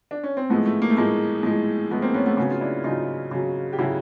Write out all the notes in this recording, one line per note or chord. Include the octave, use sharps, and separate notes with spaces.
D4
C#4
C4
A2 F3 G#3 A3 B3
A3
A#3
A3
A2 F3 G#3 A#3
A2 F3 G#3
A2 F3 G#3 A3 B3
A#3 C4
B3 C#4
A3 B3
C#3 F#3 B3 C#4
F4
D4 E4
C#3 F#3 D#4 F4
C#3 F#3
G4
C#3 F#3 E4 F#4